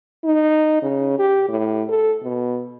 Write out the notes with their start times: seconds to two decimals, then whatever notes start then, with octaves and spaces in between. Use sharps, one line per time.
0.25 D#4
0.83 C#3
1.19 G4
1.49 A2
1.89 A4
2.24 B2